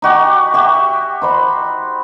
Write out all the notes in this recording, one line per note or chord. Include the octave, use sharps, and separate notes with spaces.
D#4 F#4 G4 G#5
F#4 G4 E5
D#4 C5 B5